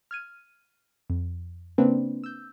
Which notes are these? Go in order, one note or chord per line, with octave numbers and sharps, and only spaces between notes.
F6 G#6 D#7
F2
C#3 A#3 C4 D4 B4 C5
E6 G6